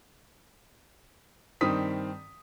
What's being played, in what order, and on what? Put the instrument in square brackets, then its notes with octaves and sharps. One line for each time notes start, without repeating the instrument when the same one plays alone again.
[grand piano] G2 D#3 C4 D#6 B6